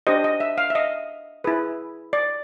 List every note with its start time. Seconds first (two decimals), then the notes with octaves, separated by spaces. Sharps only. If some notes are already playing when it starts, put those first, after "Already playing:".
0.07 D4 G4 C5 D#5
0.24 D#5
0.40 E5
0.58 F5
0.70 E5
0.75 D#5
1.44 E4 G#4 B4
2.13 D5